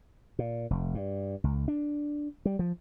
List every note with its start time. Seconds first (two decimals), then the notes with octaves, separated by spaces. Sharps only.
0.39 A#2
0.70 F1
0.95 G2
1.44 C#2
1.68 D4
2.45 G3
2.59 F3